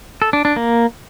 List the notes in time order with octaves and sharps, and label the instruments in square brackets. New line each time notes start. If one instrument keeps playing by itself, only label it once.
[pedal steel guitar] A4
D4
D4
A#3